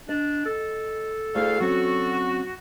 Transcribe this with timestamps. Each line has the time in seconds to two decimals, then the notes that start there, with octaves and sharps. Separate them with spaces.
0.09 D4 D#5
0.46 A4
1.35 D2 A3 E4 G#4 F5
1.60 F#3 C4 C#4 F#4